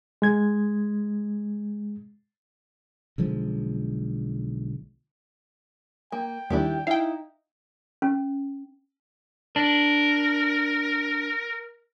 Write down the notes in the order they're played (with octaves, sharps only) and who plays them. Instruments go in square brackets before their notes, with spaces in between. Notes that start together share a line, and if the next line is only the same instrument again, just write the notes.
[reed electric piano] G#3 G#6
[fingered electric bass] B1 D3 F3 G#3
[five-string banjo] A#3 [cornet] G5
[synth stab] D#2 D#3 G3 [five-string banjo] D4 E4 G4
[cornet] D#4 [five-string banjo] E4 [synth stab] F5 G5
[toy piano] C#4
[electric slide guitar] D4 [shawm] A#4